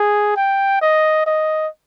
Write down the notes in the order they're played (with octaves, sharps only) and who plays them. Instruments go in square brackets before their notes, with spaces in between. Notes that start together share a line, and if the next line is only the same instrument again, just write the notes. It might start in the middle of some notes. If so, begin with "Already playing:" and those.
Already playing: [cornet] G#4
G5
D#5
D#5